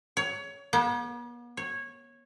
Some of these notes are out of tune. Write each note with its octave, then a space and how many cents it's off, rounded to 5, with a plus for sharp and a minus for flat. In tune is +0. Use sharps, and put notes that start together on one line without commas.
C#5 +20
B3 -45
C#5 -15